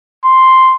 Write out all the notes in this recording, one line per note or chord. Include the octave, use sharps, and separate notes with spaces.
C6